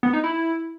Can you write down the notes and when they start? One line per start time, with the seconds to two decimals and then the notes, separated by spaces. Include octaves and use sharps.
0.03 B3
0.13 D#4
0.24 E4